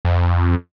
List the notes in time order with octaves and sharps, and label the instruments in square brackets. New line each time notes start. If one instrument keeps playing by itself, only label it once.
[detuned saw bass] F2